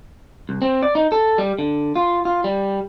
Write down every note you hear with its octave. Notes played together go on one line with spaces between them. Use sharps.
C2
C4
D5
D#4
A4
G3
D3
F4
F4
G3